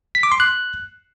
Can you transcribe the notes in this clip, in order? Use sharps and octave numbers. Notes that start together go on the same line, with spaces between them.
B6
D6
C6
F#6